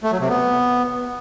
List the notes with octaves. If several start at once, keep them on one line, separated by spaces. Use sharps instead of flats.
A3
F#3
C3
B3